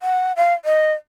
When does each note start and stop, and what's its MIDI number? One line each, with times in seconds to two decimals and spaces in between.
0.01 0.32 78
0.36 0.54 77
0.65 0.93 75